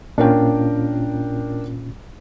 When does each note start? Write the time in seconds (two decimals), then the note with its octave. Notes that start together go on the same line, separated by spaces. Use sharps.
0.18 A#2 C#4 D4 F4 A#4 G5